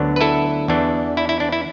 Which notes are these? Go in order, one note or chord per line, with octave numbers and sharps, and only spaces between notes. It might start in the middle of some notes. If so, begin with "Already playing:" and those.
Already playing: D2 D3 F#3 B3 D4
B4
E4 A4
E2 E3 D4
E4
E4
D4
E4